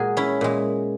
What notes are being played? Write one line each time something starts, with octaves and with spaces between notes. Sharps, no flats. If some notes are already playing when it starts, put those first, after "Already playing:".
Already playing: A#2 G#3 F#4 G#4 A#4
C#4 E4
A#2 G#3